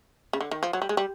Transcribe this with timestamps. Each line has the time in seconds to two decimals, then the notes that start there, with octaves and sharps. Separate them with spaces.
0.33 C#3
0.41 D3
0.51 D#3
0.63 F3
0.73 F#3
0.82 G3
0.89 G#3
0.97 G3